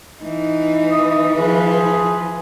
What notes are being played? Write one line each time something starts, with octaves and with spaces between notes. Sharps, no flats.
E3 D#4
D#6
F3 G#4 B4